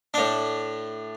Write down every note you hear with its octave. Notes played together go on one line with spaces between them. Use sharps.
A2 D4